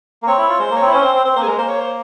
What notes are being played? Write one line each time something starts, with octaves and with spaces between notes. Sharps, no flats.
A#3
C4 C#5
E4
F4
G#3 C5
A#3
C#5
C4
E4
C#4 C5
C4
C4
C4 C5
A#3 C5
G#4
G#3 A#4
A#3 C5
C#5
C5